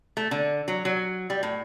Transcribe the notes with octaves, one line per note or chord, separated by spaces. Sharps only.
A3
D3
F#3
F#3
G3
A2